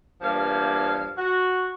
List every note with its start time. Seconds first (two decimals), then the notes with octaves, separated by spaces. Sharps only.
0.21 E2 G2 F3 A#3 F5
1.17 F#4